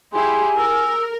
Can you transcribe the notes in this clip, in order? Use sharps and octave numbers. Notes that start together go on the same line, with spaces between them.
E4 G4 G#4 G#5 C6
A#4 E6